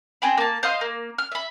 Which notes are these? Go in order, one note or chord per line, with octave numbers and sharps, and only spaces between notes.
C4 G#4 G5 B5
A#3 A5
C5 D#5 F5 C6
A#3
F6
E5 B5